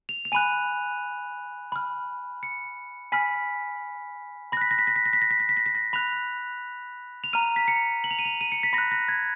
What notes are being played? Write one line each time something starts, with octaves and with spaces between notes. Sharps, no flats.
F7
F7
G#5 B5 F#6 D#7
B5 F6
C#7
G#5 B5 F6 B6
B5 F#6 A#6 B6
A#6
B6
A#6
B6
A#6
B6
A#6
B6
A#6
B6
A#6
B6
A#6
B5 F#6 F7
F7
A#5 F6 D#7
B6
C#7
F#7
F7
D#7
F7
D#7
C#7
B6
B5 A#6
F#6
A#6
G#6